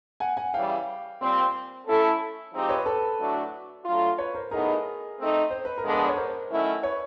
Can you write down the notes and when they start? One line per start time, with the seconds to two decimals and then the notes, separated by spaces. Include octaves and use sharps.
0.20 F#5 G#5
0.37 F#5 G#5
0.54 C#3 E3 G3 F5 G5
1.20 A#2 G3 C4
1.86 A3 C#4 E4 A4
2.53 F3 G#3 C4 D#4 G4
2.69 B4 C#5
2.86 A4 B4
3.19 A2 F#3 A3 D4 F#4
3.85 F#3 A3 D4 F4
4.18 B4 C#5
4.35 A#4 C5
4.51 A2 F#3 B3 D#4 G#4 A#4
5.18 A3 C4 D#4
5.50 C5
5.65 B4
5.78 A#4
5.84 D3 F3 G#3 B3 D4
5.92 A4 B4
6.09 C#5
6.17 A#4 C5
6.50 D#3 F#3 A3 C#4 E4
6.83 B4 C#5